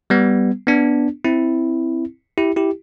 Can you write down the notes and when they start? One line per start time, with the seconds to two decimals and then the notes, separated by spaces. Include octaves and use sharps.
0.10 G3 B3
0.67 B3 D4
1.24 C4 E4
2.38 E4 G4
2.56 E4 G4